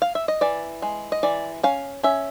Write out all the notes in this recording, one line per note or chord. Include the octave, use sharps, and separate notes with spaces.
F5
E5
D#5
E3 D5
G#3
D#5
E3 D5
C#4 F5
C#4 E5